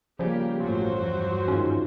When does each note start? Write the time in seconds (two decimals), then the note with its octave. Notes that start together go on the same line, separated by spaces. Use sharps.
0.19 C#3 F3 G3 A#3 G4 G#5
0.60 A1 G2 F#3 A3 C#4 F4 F#4 C5
0.92 E2 G2 E3
1.48 G#2 D#3 F3 C#4